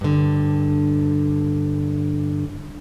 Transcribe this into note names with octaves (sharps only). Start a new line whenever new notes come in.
G2 D3